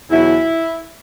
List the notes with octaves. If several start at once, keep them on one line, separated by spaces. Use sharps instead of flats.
E2 B2 F#3 E4